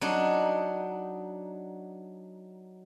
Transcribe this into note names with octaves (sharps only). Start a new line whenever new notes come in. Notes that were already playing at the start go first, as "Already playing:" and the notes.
F#3 D4 D#4